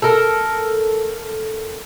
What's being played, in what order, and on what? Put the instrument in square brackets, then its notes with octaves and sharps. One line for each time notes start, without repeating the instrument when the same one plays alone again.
[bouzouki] A4 A#4